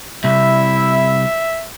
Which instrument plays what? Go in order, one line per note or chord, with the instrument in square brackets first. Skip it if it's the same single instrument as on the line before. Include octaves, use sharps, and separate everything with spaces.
[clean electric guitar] C2 C3 [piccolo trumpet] E4 [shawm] E5